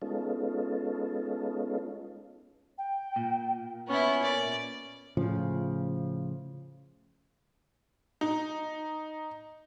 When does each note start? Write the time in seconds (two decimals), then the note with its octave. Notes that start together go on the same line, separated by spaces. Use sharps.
0.02 G#3 B3 C#4 D#4 F4 A4
2.77 G5
3.16 A#2
3.88 B3 C#4 E4 C#6
4.22 A#4 D5
5.17 A2 C#3 F3
8.21 D#4